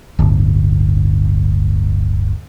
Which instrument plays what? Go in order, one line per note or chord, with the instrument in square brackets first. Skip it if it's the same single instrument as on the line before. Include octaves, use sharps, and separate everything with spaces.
[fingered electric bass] D1 G1